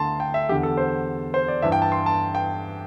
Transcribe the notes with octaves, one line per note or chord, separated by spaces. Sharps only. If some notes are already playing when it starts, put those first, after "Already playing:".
Already playing: D2 D3 A5 C6
G5
E5
E2 D3 G4
A4
C5
C5
D5
G2 E3 E5
G5
A5
C6
A5
G5